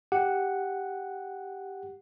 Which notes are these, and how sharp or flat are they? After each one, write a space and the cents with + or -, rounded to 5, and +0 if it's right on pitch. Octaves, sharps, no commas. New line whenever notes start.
G4 +0 F#5 +0